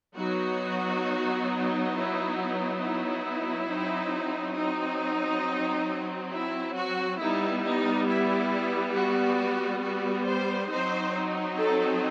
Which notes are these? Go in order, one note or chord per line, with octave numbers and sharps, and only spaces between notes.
F#3 B3 D#4 F#4
E4
E4
F#3 C4 D#4
D#4
E4
F#4
G3 B3 D#4 E4
D#4
E4
F#4
F#4
C5
F#3 C4 D#4 C5
A4